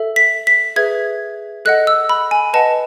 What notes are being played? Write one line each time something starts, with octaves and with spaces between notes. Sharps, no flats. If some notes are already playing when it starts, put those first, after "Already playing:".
Already playing: A4 E5
B6
B6
G#4 B4 E5 G#6
A4 D#5 F#5 F#6
E6
B5
G#5
B4 D#5 F#5 A5